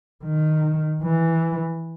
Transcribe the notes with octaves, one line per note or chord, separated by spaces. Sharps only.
D#3
E3